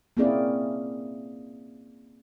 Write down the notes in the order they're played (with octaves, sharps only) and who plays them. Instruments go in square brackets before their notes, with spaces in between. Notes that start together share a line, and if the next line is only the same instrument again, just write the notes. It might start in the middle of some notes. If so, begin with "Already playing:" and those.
[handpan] A#3 C4 C#4 E4 G#4 D5